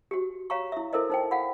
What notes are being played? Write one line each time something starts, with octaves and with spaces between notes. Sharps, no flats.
F#4 G4
C#5 F5 A#5 C#6
E4 E5
E4 A4 A#4 C5 D#5
D#4 C5 G5
F5 F#5 B5